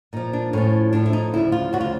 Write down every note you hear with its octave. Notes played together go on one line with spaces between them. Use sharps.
A#2 F3 D#4
D4
A2 F3 C#4
A2 F3 D4
E4
D#4
D2 C#3 F3 E4
F4
D2 C#3 F3 F#4
F4